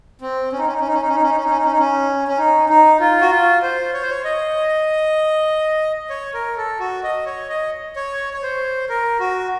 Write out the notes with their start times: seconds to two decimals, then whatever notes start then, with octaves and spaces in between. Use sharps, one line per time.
0.21 C4
0.52 C#4
0.59 D#4
0.67 C#4
0.73 D#4
0.81 C#4
0.88 D#4
0.94 C#4
1.02 D#4
1.09 C#4
1.15 D#4
1.23 C#4
1.29 D#4
1.37 C#4
1.44 D#4
1.50 C#4
1.57 D#4
1.65 C#4
1.71 D#4
1.79 C#4
2.28 C#4
2.38 D#4
2.69 D#4
3.00 F4
3.21 F#4
3.31 F4
3.63 C5
3.93 C#5
4.02 C5
4.10 C#5
4.25 D#5
6.10 C#5
6.34 A#4
6.57 A4
6.79 F#4
7.03 D#5
7.26 C#5
7.49 D#5
7.96 C#5
8.34 C#5
8.43 C5
8.89 A#4
9.20 F#4